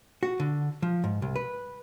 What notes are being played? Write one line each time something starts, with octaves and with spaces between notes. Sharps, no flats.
F#4
D3
F3
G#2
C2
B4